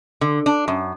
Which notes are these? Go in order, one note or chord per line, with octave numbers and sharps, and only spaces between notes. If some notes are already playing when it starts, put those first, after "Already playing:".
D3
D4
F#2